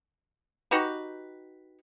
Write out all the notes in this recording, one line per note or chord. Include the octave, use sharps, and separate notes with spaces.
D#4 F#4 G4 B4